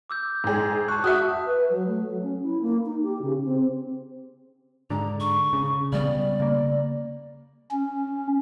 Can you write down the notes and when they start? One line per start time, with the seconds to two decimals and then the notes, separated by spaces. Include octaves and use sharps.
0.10 D6 E6 G6
0.44 G#2 G#4
0.88 A5 C#6 F#6
1.04 F#4 E5 D#6 F#6
1.46 B4
1.70 F#3
1.87 A3
2.06 F#3
2.23 C#4
2.43 E4
2.61 A#3
2.86 D#4
3.03 G4
3.22 C#3
3.45 C4
4.90 G#2 D3 A#5
5.20 C#6
5.53 C#3
5.92 C#3 G3 B3 D5
6.40 C#3 A#3
7.71 C#4